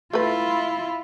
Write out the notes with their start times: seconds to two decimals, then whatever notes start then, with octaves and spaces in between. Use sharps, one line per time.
0.13 A3 E4 F4 B4